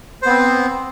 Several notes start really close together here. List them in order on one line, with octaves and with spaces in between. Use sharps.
C5 B3 C4